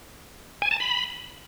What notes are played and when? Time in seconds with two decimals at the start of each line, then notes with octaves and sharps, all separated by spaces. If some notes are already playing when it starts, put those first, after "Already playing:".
0.62 G#5
0.71 A5
0.80 B5